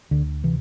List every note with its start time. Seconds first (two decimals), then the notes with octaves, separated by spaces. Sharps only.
0.11 D2 D3
0.43 C3 E3